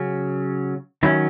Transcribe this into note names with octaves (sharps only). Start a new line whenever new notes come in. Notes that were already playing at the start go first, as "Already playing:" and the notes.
Already playing: C#3 F#3 C#4
D#3 F#3 C#4 E4